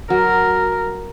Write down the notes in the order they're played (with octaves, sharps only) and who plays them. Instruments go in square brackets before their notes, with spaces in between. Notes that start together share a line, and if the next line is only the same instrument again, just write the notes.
[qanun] F#3 [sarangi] A#4